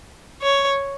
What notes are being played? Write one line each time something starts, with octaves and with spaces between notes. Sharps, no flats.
C#5